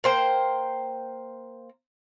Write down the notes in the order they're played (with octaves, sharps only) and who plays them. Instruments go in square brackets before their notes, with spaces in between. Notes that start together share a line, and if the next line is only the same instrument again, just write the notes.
[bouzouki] A#3 C5 G5